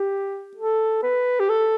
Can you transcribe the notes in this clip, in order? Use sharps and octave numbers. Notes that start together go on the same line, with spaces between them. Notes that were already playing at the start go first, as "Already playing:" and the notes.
Already playing: G4
A4
B4
G4
A4